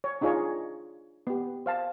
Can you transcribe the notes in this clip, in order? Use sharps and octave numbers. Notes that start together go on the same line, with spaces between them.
C#5
D4 D#4 F4 G#4 C#5
B3 G4
C5 F5 A5